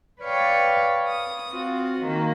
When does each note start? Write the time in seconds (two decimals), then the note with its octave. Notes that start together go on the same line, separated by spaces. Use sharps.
0.21 B4 C#5 D5 F5 G5 C#6
1.07 D#6
1.49 C4 F4 F#4
2.01 D#3 A#3